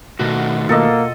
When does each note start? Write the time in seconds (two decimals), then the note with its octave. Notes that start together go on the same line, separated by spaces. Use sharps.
0.19 B2 D#3 A3 F#4 A#6
0.69 B2 A#3 F4 A4 D#5